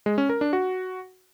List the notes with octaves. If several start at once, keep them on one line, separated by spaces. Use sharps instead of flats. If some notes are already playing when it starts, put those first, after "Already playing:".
G#3
C#4
A#4
D4
F#4